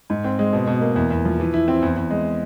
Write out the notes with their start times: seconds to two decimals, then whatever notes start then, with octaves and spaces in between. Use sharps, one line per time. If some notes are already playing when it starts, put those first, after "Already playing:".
0.10 G#2
0.24 C4
0.39 G#3
0.53 B2
0.67 B2
0.81 A#3
0.96 E2
1.10 E2
1.25 F3
1.40 E3
1.54 E4
1.68 C4
1.82 E2
1.96 E2
2.10 G#3